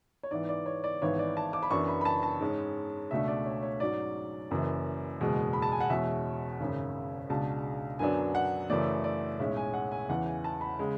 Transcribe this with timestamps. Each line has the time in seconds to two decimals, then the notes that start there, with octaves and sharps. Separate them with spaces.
0.23 C#5
0.31 G#2 E3 B3 D5
0.49 D5
0.66 C#5
0.84 D5
1.02 G#1 G#2 E3 B3 C#5
1.19 D5
1.37 A5
1.53 D6
1.63 B5
1.71 F#2 E3 B3 D4 C#6
1.88 B5
2.01 B5
2.05 A5
2.23 A5
2.40 G#2 G#3 C#4
3.11 C#2 B2 A3 D4 E5
3.28 D5
3.46 C#5
3.63 C#5
3.80 G#2 F#3 C#4 D5
4.51 F#1 F#2 E3
5.21 F#1 E2 B2 G#3
5.53 B5
5.62 A5
5.72 G#5
5.80 F#5
5.90 E2 B2 G#3 C#4 E5
6.60 G#1 F#2 C#3
7.29 C#2 B2 G#3 D4 A5
7.99 F#2 D3 F#3 B3 D4 G#5
8.35 F#5
8.70 F#2 C#3 E3 A3 D5
9.04 D5
9.39 B1 A2 G#3 C#4 E5
9.57 G#5
9.74 F#5
9.92 G#5
10.09 E2 C#3 E3 F#5
10.26 G#5
10.44 A5
10.61 B5
10.79 C#3 G#3